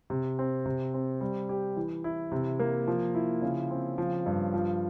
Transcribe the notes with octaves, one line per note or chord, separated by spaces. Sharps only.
C3
C4
C3
C4
G3
G4
E3
E4
C3
A#3
F3
E4
C#3
C4
F3
G2
F3